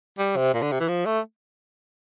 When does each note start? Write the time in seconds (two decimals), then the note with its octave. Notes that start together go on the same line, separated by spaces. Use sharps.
0.18 G3
0.36 C3
0.54 A#2
0.62 D3
0.72 C3
0.80 E3
0.88 F3
1.06 A3